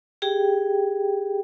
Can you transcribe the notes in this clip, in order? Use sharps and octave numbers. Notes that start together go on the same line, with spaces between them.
G4 G#4 G5